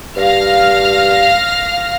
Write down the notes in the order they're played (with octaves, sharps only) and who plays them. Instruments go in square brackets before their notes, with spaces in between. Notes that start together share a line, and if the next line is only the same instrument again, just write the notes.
[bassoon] G2 [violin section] F5 F6 A#6